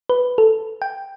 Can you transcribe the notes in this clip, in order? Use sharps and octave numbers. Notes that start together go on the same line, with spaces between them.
B4
A4
G5